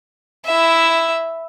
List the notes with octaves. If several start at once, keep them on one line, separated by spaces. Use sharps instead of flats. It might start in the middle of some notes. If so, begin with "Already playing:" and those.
E4 E5